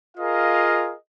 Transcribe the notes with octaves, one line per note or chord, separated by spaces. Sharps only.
F4 G#4 A#4 D#5 F5